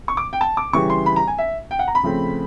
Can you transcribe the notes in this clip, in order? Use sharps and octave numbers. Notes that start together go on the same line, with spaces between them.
C#6
D6
G5
A5
D6
C#3 E3 G3 C#6
C6
B5
A#5
G#5
E5
G5
F#5
A#5
B5
C#3 F3 A3 C4